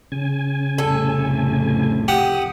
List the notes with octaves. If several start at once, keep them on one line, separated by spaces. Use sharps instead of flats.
C#3 G#5
C2 F2 A2 A4
G4 F#5 D#6